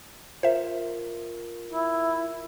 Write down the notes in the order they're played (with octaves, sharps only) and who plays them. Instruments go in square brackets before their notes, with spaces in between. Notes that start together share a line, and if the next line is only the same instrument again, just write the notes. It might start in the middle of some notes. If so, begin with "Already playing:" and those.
[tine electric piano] F4 A#4 [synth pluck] C5 E5
[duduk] E4